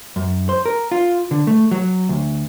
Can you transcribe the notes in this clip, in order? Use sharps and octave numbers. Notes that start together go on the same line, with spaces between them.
F#2
C5
A#4
F4
D3
A3
F#3
D2